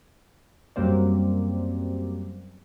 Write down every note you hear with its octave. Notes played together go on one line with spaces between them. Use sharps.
F#2 G3 A#3 C4 D5